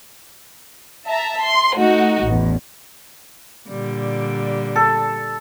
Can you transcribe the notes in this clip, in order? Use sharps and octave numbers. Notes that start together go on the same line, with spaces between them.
E5 A5 A#5
C6
A3 D#4 F#4
A1 E2
A#2 D3 G3
A4